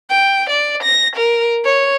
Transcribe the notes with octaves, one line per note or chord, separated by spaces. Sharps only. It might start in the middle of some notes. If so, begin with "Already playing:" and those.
G5
D5
A#6
A#4
C#5